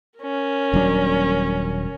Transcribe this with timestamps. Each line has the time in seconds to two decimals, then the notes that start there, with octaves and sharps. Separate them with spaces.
0.19 C#4 A#4
0.73 D#1 F#3 D4